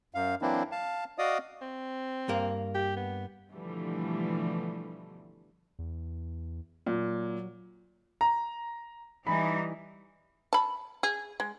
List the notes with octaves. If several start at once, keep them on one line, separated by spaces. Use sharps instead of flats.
F#2 F5
E3 F#3 A#3 C4 D4 E4
F5 A5
F#4 D5 D#5 F5 D#6
C4
G2 A#3 A#4
G4
B3
B2 D3 E3 F3 G3 A3
E2
A#2 F#3
A#5
E3 G3 D#4 B5
A5 B5
G#4
G#3